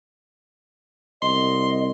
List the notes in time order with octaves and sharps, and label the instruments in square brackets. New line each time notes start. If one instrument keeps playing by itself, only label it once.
[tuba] C2 [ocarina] D#5 [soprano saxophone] C6